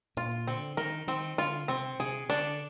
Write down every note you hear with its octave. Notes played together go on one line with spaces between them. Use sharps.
A#2 F4
D3 C4
D#3 A#4
D#3 C4
D3 F4
C3 C4
C3 G#4
D3 D4